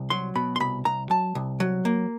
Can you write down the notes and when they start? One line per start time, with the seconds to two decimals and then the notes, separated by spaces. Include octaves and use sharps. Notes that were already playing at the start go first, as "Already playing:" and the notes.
Already playing: C2
0.10 F#3 C6
0.35 B2 B5
0.56 C6
0.60 C2 B5
0.85 C2 A#5
1.10 F#3 A5
1.35 C2
1.60 F#3
1.85 A#3